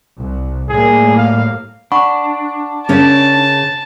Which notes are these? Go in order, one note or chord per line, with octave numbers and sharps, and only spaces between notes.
C2
A2 G3 A#3 G#4
F5
D4 F#5 B5 C#6
C#3 C#4 A#4 A5